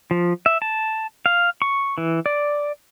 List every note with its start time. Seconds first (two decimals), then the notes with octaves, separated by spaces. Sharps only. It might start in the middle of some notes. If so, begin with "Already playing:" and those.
0.11 F3
0.46 E5
0.62 A5
1.26 F5
1.62 C#6
1.98 E3
2.26 D5